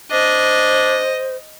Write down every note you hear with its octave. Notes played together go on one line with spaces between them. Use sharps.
D4 C5 D#5